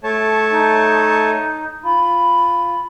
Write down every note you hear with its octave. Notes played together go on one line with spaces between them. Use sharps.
A3 C#5 A5
D#4
F4 B5